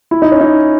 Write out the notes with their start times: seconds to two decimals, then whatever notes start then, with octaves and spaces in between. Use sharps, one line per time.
0.11 E4
0.22 D#4
0.32 C#4
0.41 D#4